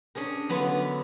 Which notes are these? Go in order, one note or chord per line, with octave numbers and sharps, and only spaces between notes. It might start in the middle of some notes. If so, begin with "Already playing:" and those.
C#4 D4 G#4 A#4
D3 F#3 B3 E4 F4 D5